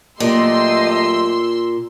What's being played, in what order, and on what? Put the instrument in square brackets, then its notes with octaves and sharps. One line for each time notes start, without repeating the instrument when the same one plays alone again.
[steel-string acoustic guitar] A#2 [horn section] F#3 A3 G4 [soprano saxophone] D#5 [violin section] C6 E6